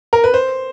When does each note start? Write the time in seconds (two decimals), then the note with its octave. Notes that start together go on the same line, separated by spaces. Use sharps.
0.13 A#4
0.24 B4
0.34 C5